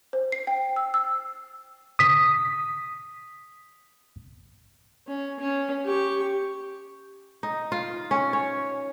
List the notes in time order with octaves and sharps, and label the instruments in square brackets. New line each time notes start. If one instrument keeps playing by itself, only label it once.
[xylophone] C5
C7
G5
E6
E6
[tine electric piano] D#6 B6
[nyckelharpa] C#4
C#4
G4 C#6
[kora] D#4
F4
C#4
C#5